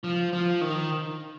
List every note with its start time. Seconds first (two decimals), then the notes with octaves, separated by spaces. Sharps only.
0.04 F3
0.33 F3
0.61 D#3